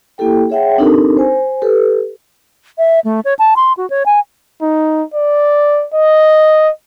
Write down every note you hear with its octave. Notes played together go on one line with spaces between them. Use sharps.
A#3 E4 G4 A4 G5
G#4 C#5 E5 F#5 G5
C4 D4 D#4 G4 A4 A#4
C5 G#5
G4 A4 B4
E5
A3
C#5
A5
C6
F#4
C#5
G#5
D#4
D5
D#5